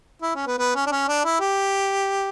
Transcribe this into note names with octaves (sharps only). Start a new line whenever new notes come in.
E4
C#4
B3
B3
C#4
D4
C#4
D4
E4
G4